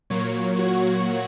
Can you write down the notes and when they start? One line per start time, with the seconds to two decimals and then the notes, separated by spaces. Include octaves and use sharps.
0.10 A#2 F#3 A#3 C#5
0.59 F#4